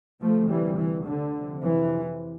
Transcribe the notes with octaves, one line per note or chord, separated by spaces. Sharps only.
D2 C3 F3 A3
E3 G3
E3
D3
F2 C3
E3